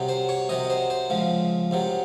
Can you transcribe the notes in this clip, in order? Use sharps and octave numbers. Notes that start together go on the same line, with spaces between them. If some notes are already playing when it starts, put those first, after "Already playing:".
Already playing: C2 C3 F#3
C5
C#5
C2 C3 F#3 D#5
C5
C5
C#2 C#3 F3
C2 C3 F#3